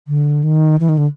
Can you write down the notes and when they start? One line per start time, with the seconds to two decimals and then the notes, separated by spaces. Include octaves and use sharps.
0.08 D3
0.44 D#3
0.80 E3
0.89 D#3
0.98 D3